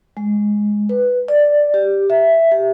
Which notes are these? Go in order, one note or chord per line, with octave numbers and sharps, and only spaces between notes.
G#3
B4
D5
G4
E5
G4